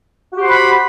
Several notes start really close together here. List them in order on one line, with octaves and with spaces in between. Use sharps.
F#4 G4 C5 F#5 B5